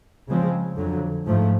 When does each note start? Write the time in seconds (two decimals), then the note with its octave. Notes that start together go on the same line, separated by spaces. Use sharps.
0.29 C#3 F3 G#3 C4
0.77 F2 D3 F#3
1.27 G#2 F3 A3